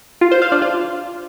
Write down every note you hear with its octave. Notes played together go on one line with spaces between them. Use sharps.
F4
C5
F5
D4
F4